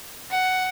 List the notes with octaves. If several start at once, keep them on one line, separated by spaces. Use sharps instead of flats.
F#5